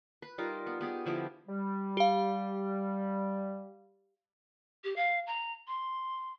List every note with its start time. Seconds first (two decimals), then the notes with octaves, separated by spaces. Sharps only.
0.22 B4
0.38 G3 D#4 F4 A#4
0.66 B3
0.81 B3 G4 G#4
1.06 D3 F3 E4 G4
1.48 G3
1.97 G4 F5
4.84 G4
4.96 F5
5.27 A#5
5.67 C6